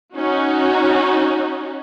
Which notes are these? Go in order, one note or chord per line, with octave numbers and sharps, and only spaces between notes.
C#4 D#4 F#4